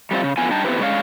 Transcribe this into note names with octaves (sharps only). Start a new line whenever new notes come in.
G3 A3 C4 F4
C#3
F2 D3 B3 F4 G#5
G2 D#4 G5 A5
A3 B3 C4 E4 G4 B4
G#3 C#4 C#5 D5 F5